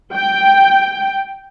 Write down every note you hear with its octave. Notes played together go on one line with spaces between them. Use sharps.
G5